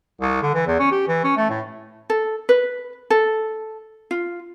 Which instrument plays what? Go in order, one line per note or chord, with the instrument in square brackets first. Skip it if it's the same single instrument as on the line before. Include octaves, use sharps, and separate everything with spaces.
[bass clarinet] C2
D3
E3
E2
C#4
G4
E3
C#4
A3
A2
[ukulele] A4
B4
A4
F4